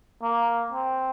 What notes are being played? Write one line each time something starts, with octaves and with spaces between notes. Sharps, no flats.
A#3
C4